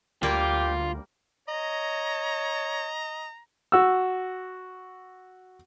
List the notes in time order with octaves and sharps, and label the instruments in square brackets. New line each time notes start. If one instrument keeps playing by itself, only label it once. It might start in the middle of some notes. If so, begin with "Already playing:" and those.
[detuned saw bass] D2 [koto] G3 A#3 A#4 [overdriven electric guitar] F4 [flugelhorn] G4
[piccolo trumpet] C#5 [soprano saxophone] D#5 [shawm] A#5
[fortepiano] F#4 E6